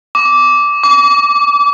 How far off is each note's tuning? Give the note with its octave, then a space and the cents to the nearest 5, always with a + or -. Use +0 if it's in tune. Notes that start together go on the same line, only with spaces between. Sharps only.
D6 -10
D6 -35